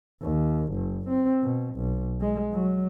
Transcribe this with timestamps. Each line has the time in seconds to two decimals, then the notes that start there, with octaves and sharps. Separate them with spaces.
0.22 D#2
0.73 F#1
1.09 C4
1.42 B2
1.76 B1
2.21 G#3
2.53 F#3